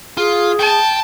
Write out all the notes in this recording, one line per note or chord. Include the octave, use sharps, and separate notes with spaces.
F4 G#4
G5 A5